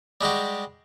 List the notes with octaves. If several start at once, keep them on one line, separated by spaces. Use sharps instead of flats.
G3 G#3 F#4 G4